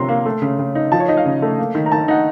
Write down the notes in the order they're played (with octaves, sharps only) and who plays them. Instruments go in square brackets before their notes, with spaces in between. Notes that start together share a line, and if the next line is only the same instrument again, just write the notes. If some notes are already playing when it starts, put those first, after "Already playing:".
Already playing: [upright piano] C3 F3 C#4 A#5 C6
A#3
A3
C#3
C#3
D#4
F3 A5
C#5
D#4 D#5
F5
C#3
A3
A#3
D#3
A#5
D#3 A5
D#4 F#5